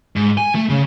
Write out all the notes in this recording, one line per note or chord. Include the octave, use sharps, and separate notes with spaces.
G#2
G#5
A3
C#3